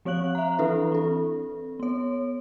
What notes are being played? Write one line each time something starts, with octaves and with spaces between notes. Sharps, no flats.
F3 C4 C#5 F5 F#6 F#7
E5 A#5
E3 D4 E4 A4 B4
C4 A4
B3 C#5